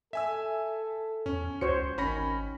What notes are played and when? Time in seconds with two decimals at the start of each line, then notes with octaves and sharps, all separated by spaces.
0.13 A4 E5 G#5 E6
1.26 E2 C#4
1.61 C#2 F#4 C5 C#5 C#7
1.98 G#1 D#3 C#4 B5 A#6